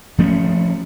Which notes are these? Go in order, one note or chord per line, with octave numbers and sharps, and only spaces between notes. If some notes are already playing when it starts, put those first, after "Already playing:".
F3 A3 C#4